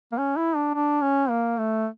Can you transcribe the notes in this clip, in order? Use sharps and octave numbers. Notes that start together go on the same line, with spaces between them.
A#3
C#4
E4
D4
D4
C#4
A#3
A3